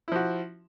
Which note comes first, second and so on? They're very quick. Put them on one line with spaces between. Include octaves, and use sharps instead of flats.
E4 F3 F#4